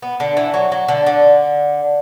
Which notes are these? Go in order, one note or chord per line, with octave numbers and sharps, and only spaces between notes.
B3
D3
E3
F#3
F#3
D3
D3